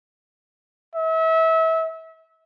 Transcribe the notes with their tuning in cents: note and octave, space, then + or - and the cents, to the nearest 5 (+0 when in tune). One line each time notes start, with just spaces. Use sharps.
E5 -30